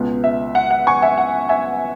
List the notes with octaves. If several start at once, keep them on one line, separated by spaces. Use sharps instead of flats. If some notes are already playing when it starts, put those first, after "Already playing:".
Already playing: C#2 B2 B3
E5
F#5
F#5
G#5 C#6
E5 G#5
F#5
E5 G#5